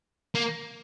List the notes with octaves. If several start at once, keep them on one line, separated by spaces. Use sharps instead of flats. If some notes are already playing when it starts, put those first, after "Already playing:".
A#3